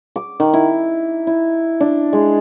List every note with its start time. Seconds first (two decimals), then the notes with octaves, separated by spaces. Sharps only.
0.16 D6
0.40 D#3
0.54 E4
1.27 E4
1.80 D4
2.13 G#3